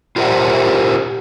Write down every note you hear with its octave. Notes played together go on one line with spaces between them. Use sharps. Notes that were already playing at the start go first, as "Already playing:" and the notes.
F4 G4 A#4 C5 E5 F#5